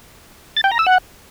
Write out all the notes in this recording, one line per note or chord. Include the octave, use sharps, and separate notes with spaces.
A6
G5
A#5
E6
F#5